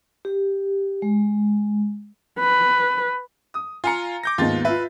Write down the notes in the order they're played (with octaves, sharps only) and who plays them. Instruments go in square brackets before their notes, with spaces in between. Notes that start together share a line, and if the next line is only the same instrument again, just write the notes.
[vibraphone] G4
G#3
[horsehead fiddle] B4
[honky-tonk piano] D#6
[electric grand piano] F4 F5 C#7 [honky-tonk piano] G#5 A#5
[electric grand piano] D6 G6 A#6
[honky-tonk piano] D#2 G#2 B3 [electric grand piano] F4 A6
[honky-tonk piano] F4 E5 [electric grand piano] B4